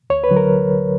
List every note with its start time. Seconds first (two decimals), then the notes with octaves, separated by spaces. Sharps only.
0.10 D2 C#5
0.24 B4
0.31 D3 F#3
0.37 A#4